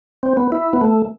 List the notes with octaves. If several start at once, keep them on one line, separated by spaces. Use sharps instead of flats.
C4
B3
E4
B3
A3